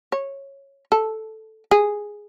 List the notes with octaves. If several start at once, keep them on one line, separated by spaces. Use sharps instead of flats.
C#5
A4
G#4